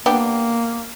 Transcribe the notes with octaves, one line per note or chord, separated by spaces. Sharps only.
A#3 B3 D4 G4